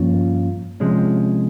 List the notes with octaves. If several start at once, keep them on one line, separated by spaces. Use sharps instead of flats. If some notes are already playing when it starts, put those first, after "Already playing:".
Already playing: G2 F3 A#3 C#4 F4
C3 F3 G#3 C#4